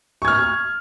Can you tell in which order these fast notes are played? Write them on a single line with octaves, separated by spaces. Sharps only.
C#6 G#6 F6